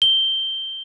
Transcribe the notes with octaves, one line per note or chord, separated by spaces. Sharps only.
G7